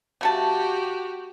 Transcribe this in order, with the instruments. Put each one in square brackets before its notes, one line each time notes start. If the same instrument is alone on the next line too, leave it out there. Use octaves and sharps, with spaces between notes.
[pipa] C#3 A3 A5 [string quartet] F#4 G4